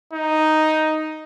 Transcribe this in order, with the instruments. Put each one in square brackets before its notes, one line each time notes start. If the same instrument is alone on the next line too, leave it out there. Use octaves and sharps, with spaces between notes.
[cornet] D#4